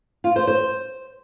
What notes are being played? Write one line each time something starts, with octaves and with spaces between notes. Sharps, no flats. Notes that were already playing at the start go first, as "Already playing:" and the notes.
F4
C5
C5